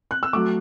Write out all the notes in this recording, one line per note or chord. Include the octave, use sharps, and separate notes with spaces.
F#6
E6
F#3 A3 D6